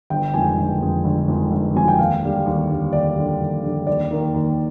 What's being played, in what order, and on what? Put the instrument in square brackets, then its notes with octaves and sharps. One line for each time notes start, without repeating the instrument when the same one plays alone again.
[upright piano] G1 G5
F2 D#3 G#3 G#5
G1
F2 D#3 G#3
G1
F2 D#3 G#3
G1
F2 D#3 G#3 G#5
G5
D#2 F5
D3 G3
D#2
D3 G3
D#2 D5
D3 G3
D#2
D3 G3
D#2 D5
D#3 A#3
D#2